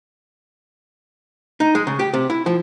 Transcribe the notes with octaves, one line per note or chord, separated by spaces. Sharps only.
D#4
G#3
C#3
G4
C3
E4
F3